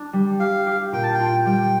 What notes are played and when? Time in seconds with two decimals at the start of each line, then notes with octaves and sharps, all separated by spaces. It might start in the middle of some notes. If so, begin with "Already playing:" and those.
Already playing: D4
0.13 G3
0.40 G4 F5
0.67 G4
0.92 A#2 G5
1.03 A5
1.14 G5
1.19 F4
1.46 G3 G5